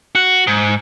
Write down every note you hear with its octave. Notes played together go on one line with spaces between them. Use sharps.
F#4
G#2